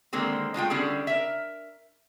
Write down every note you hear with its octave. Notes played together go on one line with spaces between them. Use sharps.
D3 D#3 G#3 A#3 C4
G#3 A3 F4 G5
D3 G3 C#4 E4 G#4
A#4 E5